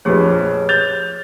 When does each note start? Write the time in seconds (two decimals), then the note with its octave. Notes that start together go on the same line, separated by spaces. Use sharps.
0.05 A#1 F2 G4 G#4 B4 C#5
0.69 G6 A6 F7